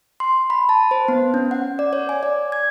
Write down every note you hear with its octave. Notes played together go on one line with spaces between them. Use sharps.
C6
B5
A5
C5
B3
C#4
F#5
D5
C#5
G#5
D5
G#6